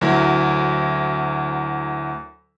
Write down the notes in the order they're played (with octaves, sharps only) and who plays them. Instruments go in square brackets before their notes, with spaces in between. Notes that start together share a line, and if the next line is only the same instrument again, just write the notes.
[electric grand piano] D2 F#3 E4 A#4